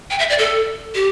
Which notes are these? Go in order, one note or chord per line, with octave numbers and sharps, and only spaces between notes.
G5
E5
D5
A4
G4